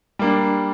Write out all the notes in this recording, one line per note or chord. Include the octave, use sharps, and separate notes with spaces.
G3 A#3 D4